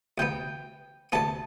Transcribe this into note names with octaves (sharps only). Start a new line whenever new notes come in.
D2 C3 E3 B3 G5
D2 C3 E3 B3 A5